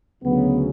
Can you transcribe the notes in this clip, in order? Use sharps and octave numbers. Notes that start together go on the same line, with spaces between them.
D2 C#3 F#3 B3